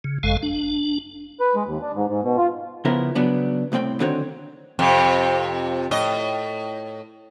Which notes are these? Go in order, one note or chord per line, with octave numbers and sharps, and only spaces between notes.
C#3
G#1 F#2 G#3 A4 F5
D4
B4
G#3
D#2
D4
G#2
G#2
B2
F4
C#3 F3 B3 E4 A#4
C#3 F#3 B3 D4
C2 A2 C4 G5 C6
D3 D#3 C4 F#4 C#5
F2 C3
A2 D#5